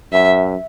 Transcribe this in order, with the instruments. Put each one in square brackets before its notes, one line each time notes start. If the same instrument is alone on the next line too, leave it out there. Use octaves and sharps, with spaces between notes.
[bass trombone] F#2 [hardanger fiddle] E5